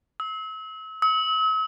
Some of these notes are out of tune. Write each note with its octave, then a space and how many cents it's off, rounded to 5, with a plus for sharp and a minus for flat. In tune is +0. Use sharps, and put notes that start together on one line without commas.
E6 -35
E6 -45